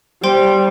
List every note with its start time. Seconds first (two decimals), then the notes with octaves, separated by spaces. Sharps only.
0.23 G3 C5 G5 C6